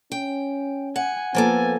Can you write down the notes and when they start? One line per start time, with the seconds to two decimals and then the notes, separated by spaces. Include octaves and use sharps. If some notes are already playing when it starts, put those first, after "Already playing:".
0.12 C#4 G5
0.96 F#5 G#5
1.35 F3 A#3 B3 A4 G#5